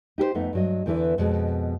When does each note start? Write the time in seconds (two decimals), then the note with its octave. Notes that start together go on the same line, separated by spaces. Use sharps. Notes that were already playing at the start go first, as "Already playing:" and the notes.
0.18 D#4 G4 A#4 C5
0.35 F2 A3 B3 D#4
0.53 G2 F#3 D#5
0.86 E2 D3 E3 E4 B4
1.18 F2 B2 G#3